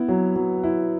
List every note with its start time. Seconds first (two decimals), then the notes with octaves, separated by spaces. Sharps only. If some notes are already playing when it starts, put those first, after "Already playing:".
Already playing: B3 E4
0.09 F#3
0.36 F#3
0.63 E4